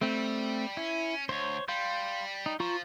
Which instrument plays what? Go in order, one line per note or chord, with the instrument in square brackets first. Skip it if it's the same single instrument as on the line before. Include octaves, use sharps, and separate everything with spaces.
[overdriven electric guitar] G3 [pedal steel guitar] A3 C4
[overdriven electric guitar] C#4 [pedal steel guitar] E4
[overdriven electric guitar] D2 [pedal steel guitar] C5 C#5
[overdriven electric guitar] G3 [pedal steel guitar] F5 C6 G6
[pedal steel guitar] D#4
[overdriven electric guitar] F3 [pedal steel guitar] F4 A#5 C#6